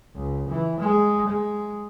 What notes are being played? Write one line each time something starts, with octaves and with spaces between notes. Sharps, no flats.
C#2
E3
G#3
G#3